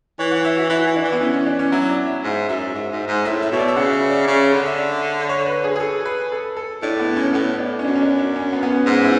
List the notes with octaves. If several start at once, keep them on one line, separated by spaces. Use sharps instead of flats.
E3 C#5
F#5
E5
F#4
E3 E4
E3
D4
E3
B3
E3 C#4
C#4
D4
C#4
F#3 E4
D5
E5
G#2
F#2 E5
G#2
G#2
G#2
A2 E5
E5
B2 C#5
D5
E5
C#3 F#5
E5
D5
C#3 C#5
D3 D5
E5
D5
C#5
B4
G#4
G#4
A4
B4
A4
A4
A2 D4
B3
C#4
A2 B3
D4
C#4
F#2 D4
C#4
D4
D4
C#4
B3
B3
C#4
G#2 C#4
E4